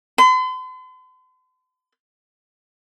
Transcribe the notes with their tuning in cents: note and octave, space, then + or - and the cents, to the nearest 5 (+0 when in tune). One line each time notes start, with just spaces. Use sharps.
C6 -45